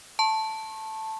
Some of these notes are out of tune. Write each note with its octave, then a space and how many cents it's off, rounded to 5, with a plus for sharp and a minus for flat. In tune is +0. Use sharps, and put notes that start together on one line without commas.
A5 +0 C#6 -35